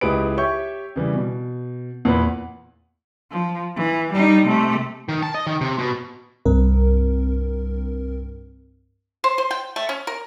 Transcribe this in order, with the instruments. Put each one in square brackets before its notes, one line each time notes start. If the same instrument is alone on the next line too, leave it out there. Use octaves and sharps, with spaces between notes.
[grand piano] C#2 E4 G4 G#4 B4 D7
G4 C#5 E5 C#6 G6
C#3 E3 G3
B2
E2 A#2 B4 B5
[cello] F3
E3
G3 D#4
C3 A3
[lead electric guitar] D#3
A5
D#5
D#3
C3
B2
[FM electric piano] C2 G2 C4 A#4
[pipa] C5
C5
G5
A3
C#4
A#4